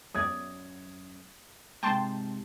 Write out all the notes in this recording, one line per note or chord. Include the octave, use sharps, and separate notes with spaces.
F#2 C#5 D5 D#6 G#6
G#2 C3 G5 A5 C6